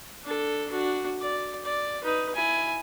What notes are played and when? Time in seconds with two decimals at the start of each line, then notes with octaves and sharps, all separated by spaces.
0.24 D4 A4
0.70 D4 F#4
1.21 D5
1.65 D5
2.04 D#4 B4
2.35 E4 G#5